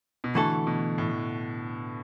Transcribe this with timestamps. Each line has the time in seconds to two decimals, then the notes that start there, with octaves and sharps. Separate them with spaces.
0.24 B2
0.35 D3 E3 A3 F#4 A4
0.67 B2
0.98 A2